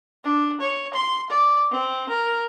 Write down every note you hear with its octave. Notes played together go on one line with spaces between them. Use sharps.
D4
C#5
C6
D5
C4
A#4